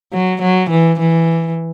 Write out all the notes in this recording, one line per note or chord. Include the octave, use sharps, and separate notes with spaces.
F#3
F#3
E3
E3